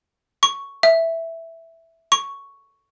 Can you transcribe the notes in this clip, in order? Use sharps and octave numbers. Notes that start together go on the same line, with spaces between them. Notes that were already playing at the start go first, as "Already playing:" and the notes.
C#6
E5
C#6